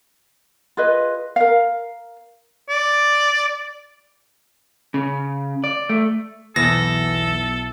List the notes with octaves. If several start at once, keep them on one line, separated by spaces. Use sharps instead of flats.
F4 G#4 B4 D#5
A#4 F5
D5
C#3
D5
A3
B1 E2 A4 A#6